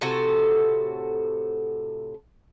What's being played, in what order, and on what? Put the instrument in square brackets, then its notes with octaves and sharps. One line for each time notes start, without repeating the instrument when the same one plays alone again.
[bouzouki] A2 C3 F#4 A4